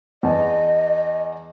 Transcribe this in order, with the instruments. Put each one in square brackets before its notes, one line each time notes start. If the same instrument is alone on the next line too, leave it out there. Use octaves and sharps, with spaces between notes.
[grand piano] E2 B3 A5 [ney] D#5